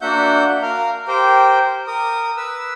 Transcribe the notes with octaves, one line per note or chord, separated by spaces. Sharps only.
A#3 D4 F#4 E5 F#5 G6
A#4 F5
G4 A#4 C5 G5
A#4 D#6
B4 E6